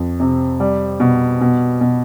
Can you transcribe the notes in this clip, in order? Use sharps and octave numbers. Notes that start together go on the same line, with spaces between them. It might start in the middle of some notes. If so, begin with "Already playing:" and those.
Already playing: F2
C3
G3
B2
B2
B2